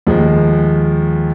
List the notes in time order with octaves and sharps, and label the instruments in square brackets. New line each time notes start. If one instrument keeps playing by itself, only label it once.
[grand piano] D#2 F3 G#3